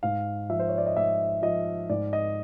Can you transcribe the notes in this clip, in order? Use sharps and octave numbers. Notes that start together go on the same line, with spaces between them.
G#2 F5
F3 E5
C5
C#5
D5
D#5
G#2 E5
F3 D#5
G#2 D5
D#5